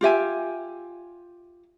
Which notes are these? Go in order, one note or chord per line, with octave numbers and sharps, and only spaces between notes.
F4 G4 E5 G#5